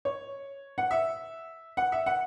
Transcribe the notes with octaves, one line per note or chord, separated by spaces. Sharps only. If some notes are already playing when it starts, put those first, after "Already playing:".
C#5
F#5
E5
F#5
E5
F#5